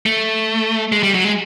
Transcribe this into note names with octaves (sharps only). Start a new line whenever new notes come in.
A3
G#3
G3
F#3
G#3